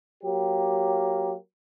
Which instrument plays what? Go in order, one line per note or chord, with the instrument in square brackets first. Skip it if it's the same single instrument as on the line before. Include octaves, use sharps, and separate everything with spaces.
[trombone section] F#3 A#3 G4